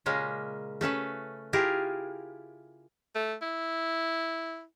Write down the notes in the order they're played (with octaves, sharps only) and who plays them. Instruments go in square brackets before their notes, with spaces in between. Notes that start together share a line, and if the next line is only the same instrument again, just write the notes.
[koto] A#2 C#3 G#3 A#3 C#4
A3 C#4 A4 B4
E4 F4 G4 G#4 A#4
[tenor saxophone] A3
E4